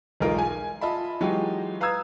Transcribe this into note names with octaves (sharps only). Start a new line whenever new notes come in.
B1 E2 G#3 D#4 F4 A#4
G#5
F4 D#5 E5 A5 B5
E3 F#3 G#3 D#4 F4 G4
B4 F5 A#5 D#6 E6 G#6